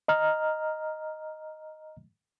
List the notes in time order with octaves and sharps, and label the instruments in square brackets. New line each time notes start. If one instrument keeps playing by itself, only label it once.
[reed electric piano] D#5 A#5 F6